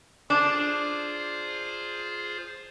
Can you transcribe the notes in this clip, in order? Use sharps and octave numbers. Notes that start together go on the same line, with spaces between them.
D4 F4 G#4 C5